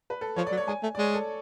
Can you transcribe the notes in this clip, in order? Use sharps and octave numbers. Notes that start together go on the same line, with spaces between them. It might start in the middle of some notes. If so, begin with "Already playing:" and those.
B4
A4
F3 C#5
D5
F#3
C#5
G#3 G#5
A3
D5
G#3 C#5
A4